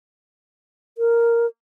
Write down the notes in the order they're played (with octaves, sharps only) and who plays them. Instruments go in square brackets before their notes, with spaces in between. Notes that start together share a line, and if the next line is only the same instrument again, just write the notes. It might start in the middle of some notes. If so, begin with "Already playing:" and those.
[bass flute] A#4